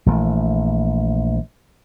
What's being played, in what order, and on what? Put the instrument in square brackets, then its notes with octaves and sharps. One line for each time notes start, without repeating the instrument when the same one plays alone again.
[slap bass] A#1 E3 A3